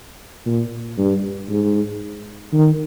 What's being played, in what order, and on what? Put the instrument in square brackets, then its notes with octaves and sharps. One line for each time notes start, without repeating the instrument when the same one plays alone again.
[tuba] A#2
G2
G#2
D#3